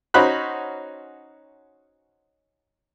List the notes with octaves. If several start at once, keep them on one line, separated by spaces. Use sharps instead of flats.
C#4 D#4 F#4 C5 B5 F#6